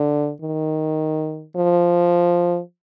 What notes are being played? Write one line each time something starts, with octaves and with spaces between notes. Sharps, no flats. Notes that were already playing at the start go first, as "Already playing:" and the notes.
Already playing: D3
D#3
F3